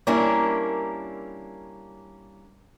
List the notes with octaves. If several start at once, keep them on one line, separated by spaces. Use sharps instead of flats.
G3 A#3 C#4 D4 E4 A#4